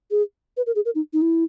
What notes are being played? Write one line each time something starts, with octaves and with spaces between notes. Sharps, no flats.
G#4
B4
A#4
G#4
A#4
D#4
D#4
E4